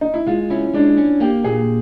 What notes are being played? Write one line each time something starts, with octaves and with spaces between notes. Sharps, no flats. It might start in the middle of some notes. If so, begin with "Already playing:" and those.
D#4
E4
G#3 F4
C#4 E4
G#3 D4
C#4
A#3 G4
A#2 G#4